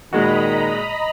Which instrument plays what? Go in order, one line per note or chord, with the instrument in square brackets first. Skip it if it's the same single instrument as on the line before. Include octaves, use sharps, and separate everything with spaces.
[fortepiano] A#2 G#3 F#4 [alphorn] D#3 [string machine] D#5 A#5 B5